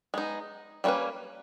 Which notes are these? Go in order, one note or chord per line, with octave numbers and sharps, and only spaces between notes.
G#3 B3 D#4
G3 A#3 C#4 F#4 B4